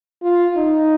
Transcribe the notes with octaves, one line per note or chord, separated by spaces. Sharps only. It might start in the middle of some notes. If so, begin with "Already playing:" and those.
F4
D#4